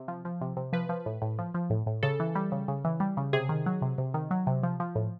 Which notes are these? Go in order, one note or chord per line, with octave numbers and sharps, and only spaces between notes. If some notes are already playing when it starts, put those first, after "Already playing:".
Already playing: C3
F3
F3
C3
C3
F3 B4
F3
A2
A2
F3
F3
A2
A2
C#3 A4
E3
G3
C#3
C#3
E3
G3
C#3
C3 G#4
D#3
F#3
C3
C3
D#3
F#3
C3
F3
F3
A2